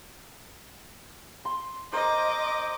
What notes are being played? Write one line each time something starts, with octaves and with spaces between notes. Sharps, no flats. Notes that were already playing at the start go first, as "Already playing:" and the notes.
C6
A#4 C5 D#5 D6